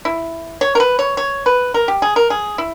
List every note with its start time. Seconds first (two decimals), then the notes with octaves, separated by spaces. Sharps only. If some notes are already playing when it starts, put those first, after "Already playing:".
0.05 E4
0.61 C#5
0.75 A#4
0.80 B4
0.99 C#5
1.17 C#5
1.46 B4
1.74 A#4
1.88 G4
2.02 G#4
2.16 A#4
2.30 G#4
2.58 E4